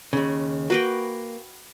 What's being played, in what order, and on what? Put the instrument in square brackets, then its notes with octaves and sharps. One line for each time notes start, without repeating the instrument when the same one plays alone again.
[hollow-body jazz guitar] D#2 C#3
[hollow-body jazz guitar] A#3 [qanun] F#4 B4 G5